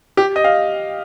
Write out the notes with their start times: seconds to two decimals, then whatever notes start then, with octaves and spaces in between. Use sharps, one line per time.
0.17 G4
0.36 D#5
0.44 F5